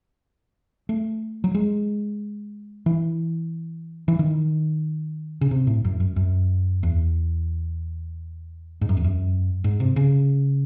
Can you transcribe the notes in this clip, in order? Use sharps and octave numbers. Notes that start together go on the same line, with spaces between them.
A3
F#3
G#3
E3
E3
D#3
C#3
C3
A2
F#2
F#2
F#2
E2
G#2
F#2
E2
F#2
G#2
C3
C#3